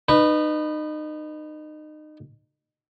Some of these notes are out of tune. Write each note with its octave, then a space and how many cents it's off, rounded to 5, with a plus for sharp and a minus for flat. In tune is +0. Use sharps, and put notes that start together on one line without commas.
D#4 -30 B4 +0